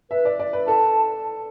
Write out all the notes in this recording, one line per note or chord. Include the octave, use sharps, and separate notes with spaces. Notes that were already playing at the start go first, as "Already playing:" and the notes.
B4 E5
D5
D5
B4
A4 A5